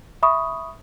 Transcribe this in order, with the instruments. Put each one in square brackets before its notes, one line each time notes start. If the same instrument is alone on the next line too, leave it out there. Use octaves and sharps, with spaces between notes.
[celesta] E5 B5 C#6 D#6